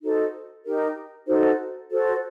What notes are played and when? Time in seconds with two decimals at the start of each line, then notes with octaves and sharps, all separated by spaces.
0.03 D#4 F#4 A4 C5
0.66 D#4 G4 A#4
1.28 D#4 F#4 A4 C5
1.91 F#4 A4 C5